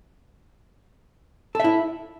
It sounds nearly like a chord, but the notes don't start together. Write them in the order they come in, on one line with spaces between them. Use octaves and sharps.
A4 E5 E4